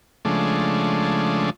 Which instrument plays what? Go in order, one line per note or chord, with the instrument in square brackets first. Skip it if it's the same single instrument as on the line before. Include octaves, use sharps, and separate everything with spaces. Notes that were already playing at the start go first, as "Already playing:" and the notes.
[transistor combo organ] C#3 F3 G#3 A3 D4